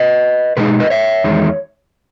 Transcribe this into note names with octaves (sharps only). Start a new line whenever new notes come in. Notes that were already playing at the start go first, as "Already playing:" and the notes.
Already playing: B4 D#5
B2 G#3 D#4 G#4 B4
B4 D#5
C#5 E5
E2 D#3 G#3